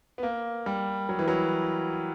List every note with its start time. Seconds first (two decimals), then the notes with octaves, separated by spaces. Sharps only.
0.18 B3
0.23 A#3
0.66 G3
1.09 F#3
1.19 E3
1.28 F#3